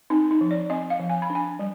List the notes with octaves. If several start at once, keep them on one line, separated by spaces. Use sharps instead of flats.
C4 D#4
D#4
F3
D5
C4 D#5
F5
F3
G#5
B5
D4
G#5
G3